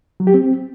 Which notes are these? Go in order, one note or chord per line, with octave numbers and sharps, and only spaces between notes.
F#3
G4
C4